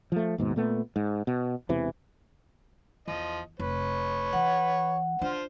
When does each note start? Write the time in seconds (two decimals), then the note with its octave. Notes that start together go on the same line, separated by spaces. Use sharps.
0.12 F3 A3
0.38 D#2 G#2 B2
0.56 A#2 A3 B3
0.96 G#2
1.27 B2
1.69 E1 E2 C3 E3
3.08 E2 F3 D#5
3.59 F1 B4 C#5
4.33 E3 F#5
5.21 D4 F4 C5